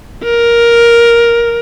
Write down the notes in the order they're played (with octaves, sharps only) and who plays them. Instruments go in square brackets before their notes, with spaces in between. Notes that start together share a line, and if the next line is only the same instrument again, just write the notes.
[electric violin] A#4